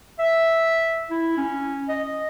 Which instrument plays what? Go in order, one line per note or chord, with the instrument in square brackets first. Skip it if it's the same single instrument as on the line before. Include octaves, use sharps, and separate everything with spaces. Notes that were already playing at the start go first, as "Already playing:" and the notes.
[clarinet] E5
E4
C#4
D#5